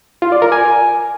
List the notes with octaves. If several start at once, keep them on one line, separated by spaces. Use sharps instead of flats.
F4
D5
A#4
G#5